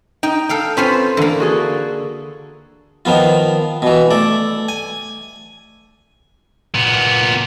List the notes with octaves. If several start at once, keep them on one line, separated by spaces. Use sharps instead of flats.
D#4 G5
A4 F5 G5
C4 C#4 F4 B4 C5
D3 E3 A#3
F#4 G#4 A4
D#3 F3 B3 F4
B2 E3
A3 D5
G#5
A#2 B3